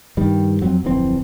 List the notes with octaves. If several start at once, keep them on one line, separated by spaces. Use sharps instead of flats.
G2 D#3 G3
F2 F#3 C4
D1 F2 E3 C4